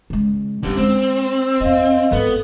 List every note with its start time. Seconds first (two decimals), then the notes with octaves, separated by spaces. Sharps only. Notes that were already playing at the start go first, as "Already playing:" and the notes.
0.10 C#3 G#3
0.63 D3 G3 C#4 D4
0.77 G#3 C4
1.61 E2 C#4 D#5 F5
2.12 G#1 G#2 B3 A4